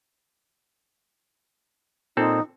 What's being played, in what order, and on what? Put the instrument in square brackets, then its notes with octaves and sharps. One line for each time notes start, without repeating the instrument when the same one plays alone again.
[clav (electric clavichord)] A#2 C4 A4 [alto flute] D#4